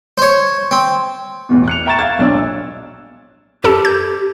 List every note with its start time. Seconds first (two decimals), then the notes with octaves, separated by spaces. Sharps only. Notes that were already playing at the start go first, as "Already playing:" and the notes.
0.18 C5 C#5
0.71 C4
1.49 A1 E2 B2
1.68 F#6 C#7 F7
1.86 E5 G5 A#5 C#6 A6 E7
1.99 F5 G#6 A6
2.19 B1 D4 C#5 E6
2.34 A#1
3.64 F#2 G4 A4 A5
3.85 G6